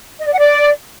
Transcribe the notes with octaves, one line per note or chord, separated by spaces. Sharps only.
D#5
D5
F#5
D5